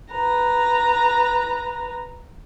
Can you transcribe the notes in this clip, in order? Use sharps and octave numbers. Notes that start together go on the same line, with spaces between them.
B4 A#5